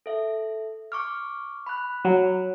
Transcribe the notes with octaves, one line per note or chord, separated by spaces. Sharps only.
A4 E5
C#6 D6 F6
B5 F#6
F#3